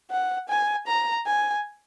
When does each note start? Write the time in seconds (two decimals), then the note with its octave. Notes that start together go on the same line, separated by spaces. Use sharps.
0.11 F#5
0.49 G#5
0.87 A#5
1.26 G#5